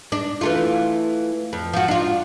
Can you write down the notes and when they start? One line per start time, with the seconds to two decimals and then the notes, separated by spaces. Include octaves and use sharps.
0.12 D4
0.41 E3 A3 F4
1.53 F2
1.73 F3 F#4
1.88 D4 F4